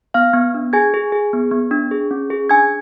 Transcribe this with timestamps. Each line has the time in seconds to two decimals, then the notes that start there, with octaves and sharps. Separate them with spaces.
0.14 B3 F5 F6
0.34 B3
0.54 D4
0.73 G#4 G#5 G#6
0.94 G#4
1.12 G#4
1.33 B3
1.51 B3
1.71 D4
1.91 G#4
2.11 C#4
2.30 G#4
2.49 D4 G#5 G#6